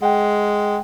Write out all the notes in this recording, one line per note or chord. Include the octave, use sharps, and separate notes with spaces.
G#3 F#5 G5